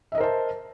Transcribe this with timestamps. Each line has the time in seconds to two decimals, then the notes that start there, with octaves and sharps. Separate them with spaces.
0.12 E5
0.15 D#5
0.18 A#4
0.21 C5
0.23 A5